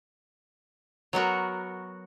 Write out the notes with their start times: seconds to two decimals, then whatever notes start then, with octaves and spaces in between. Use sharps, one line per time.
1.13 F#3 B3 F#4 A#4